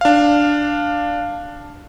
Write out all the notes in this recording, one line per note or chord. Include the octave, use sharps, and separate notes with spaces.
D4 F5